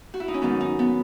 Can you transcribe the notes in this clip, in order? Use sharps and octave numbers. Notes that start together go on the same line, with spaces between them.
F#4
E4
D#4
C#4
G#2 D#3 F#3 B3
D#4
B3